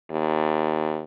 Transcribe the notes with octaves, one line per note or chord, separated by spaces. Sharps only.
D#2